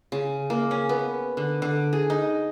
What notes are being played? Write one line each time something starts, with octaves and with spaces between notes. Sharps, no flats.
C#3
A#3
C#4
B3
D3
D3
G#4
D#4